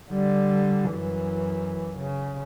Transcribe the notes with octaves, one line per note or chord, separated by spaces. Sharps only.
D3 G3
F#2 E3
C#3